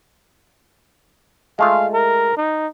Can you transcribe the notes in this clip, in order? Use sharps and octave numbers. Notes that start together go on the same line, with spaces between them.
G#3 A3 F4 F5
A#4
D#4